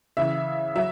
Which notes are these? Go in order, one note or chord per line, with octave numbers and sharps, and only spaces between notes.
C#3 E3 E5
F#3 E5